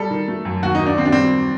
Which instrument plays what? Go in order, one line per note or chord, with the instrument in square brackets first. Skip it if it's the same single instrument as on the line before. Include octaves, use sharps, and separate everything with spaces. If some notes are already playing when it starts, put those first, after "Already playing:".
Already playing: [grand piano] G3 A4
D#3
A3
F#2
D#2 F#4
D#4
D#3
D4
D#2 C4
D4
G3 C4